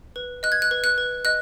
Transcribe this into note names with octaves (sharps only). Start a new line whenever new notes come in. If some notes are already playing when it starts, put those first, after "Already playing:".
B4
D#5 F#6
G#6
F#6
B4
F#6
B4
D#5 F#6